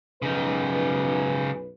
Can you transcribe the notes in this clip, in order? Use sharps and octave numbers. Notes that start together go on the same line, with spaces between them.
B1 F#2 C#3 D#4 B4